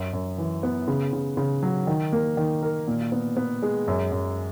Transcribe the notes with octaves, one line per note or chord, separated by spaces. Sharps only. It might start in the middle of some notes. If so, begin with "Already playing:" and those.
Already playing: F#2
F#2
E3
B3
C#3
C#3
C#3
F#3
D#3
A#3
D#3
A#4
A#2
B3
B3
G#3
F#2
F#2